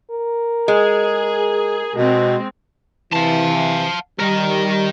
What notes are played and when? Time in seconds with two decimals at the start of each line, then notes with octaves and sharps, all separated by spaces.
0.11 A#4
0.68 G#3 G#4
1.96 B2 G#3 C4
3.12 C3 E3 F5 A5
4.19 D#3 G3 A#4